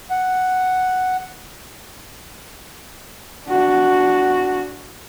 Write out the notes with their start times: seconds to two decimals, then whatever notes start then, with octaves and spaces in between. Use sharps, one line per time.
0.10 F#5
3.47 D4 F#4